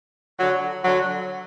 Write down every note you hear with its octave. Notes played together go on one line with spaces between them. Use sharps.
D3 F#3
D3 F#3